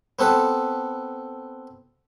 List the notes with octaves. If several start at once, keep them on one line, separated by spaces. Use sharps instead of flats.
B3 C4 A4 B4